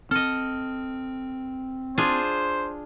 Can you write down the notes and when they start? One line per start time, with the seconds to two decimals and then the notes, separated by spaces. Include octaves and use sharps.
0.11 C4 A4 D#5 F6
1.98 D4 F4 G#4 C5